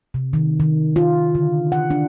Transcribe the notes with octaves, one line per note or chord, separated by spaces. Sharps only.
C3
D#3
D#3
F4
D3
F#5
D4